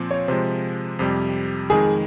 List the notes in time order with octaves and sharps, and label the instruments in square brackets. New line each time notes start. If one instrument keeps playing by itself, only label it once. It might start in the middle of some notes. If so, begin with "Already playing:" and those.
Already playing: [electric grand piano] A#2 F3 C4
[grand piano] C#5
[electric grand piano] C3 F3 G#3 [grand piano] C5
[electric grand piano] F2 C3 G3
[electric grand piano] F2 D#3 G#3 [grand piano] G#4